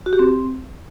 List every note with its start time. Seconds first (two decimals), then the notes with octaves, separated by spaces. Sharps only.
0.06 F#4
0.13 G4
0.19 C4